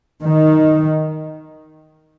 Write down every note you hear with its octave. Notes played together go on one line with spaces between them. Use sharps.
D#3